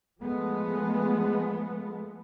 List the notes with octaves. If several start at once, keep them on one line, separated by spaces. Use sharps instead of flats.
F3 G#3 A3 B3